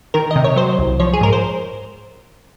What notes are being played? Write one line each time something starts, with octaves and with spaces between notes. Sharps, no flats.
D#3 A#4
C3 D#5
C#5
F#3 C5
C2
F3 C#5
G#4
G#2 A#4
C5